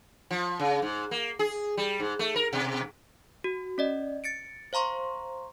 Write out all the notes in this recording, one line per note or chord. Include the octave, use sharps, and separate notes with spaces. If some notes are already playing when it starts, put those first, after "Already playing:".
F3
C#3
G#2
A#3
G#4
G3
G#2
A3
A#4
B2
F#4
C#4 D5 D#5
A6 C#7 D7
C5 F5 A#5 C6 C#6